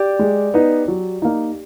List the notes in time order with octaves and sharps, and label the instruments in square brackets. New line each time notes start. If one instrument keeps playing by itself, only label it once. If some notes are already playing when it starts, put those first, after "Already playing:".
Already playing: [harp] G4 D5
[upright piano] G#3
B3 D#4
F#3
A#3 D#4